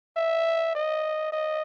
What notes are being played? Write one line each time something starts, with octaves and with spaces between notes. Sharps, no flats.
E5
D#5
D#5